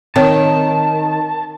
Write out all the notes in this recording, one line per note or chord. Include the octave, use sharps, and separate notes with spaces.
D#3 C4 C#5 A5